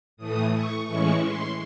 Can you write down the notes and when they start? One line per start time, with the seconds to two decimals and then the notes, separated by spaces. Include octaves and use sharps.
0.17 A2 E3 A3 D#6
0.52 C#6
0.87 A2 E3 G#3 C#4 E4 C#6
1.22 C6